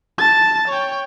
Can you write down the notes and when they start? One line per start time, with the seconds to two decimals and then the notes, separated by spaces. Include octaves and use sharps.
0.18 A5 A6
0.68 C#5 G5